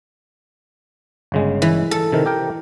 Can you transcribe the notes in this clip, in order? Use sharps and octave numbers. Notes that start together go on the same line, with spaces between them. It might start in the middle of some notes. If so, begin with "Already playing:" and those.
G1 C#3 G#3
E3
A4
C3 D#3 A#4
G4 A#4 G5